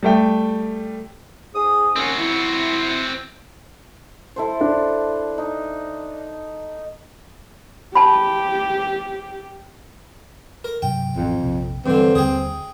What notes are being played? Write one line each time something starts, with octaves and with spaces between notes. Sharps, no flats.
G3 A3 G5
G#2 G#4 D#6
D#2 C4 C#4 F#4
E4
E4 A4 C5
D4
D#4
G4 A5 B5
A#4
G2 C3 F#3 G5
A1 F2 F3
A#1 C3
G2 D3 E3 G3 C4
D#2 D3 G3 G#4 G5